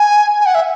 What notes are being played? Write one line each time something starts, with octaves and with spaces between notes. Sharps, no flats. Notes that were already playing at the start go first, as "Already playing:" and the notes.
Already playing: G#5
G#5
F#5
E5